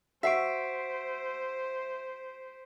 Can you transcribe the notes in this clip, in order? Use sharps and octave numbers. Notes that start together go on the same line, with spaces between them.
F#4 C5 E5 F#5 C#6 B6 C7 D7